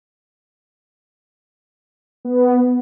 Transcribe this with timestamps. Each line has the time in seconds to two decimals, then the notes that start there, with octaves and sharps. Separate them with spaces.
2.25 B3